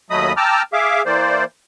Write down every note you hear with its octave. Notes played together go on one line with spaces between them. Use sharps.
D#2 F#3 A3 D#5 B5 D#6
G5 A5 A#5 D6 E6 F6
G#4 E5 F5 D6
E3 A#3 C5 D5